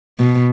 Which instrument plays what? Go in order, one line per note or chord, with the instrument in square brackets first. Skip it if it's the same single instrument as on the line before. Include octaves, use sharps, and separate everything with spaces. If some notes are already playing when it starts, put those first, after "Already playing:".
[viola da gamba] B2